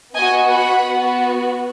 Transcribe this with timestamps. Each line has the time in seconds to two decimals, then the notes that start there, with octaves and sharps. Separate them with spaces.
0.15 B3 F#4 D#5 G#5
0.51 F#5 B5
0.88 B3 F#4